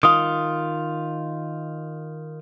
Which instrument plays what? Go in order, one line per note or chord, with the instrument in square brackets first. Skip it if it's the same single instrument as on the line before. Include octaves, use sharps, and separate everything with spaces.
[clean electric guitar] D#3 F4 [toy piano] D#6